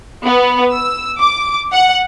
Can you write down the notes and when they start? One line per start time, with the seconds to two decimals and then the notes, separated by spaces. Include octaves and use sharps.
0.24 B3
0.73 E6
1.20 D6
1.73 F#5